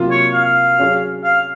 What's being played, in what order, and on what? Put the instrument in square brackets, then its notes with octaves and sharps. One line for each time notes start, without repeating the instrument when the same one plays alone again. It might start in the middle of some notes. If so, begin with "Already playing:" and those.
Already playing: [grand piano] C3 F#3 A#3 F4
[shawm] C#5
F5
[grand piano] F#3 C#4 G#4 C#5
[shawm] F5